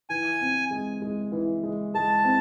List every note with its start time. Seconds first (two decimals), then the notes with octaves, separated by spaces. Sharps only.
0.10 E3 G#5
0.41 C4
0.71 G#3
1.02 G#3
1.32 E3
1.63 G#3
1.95 G#3 A5
2.24 C4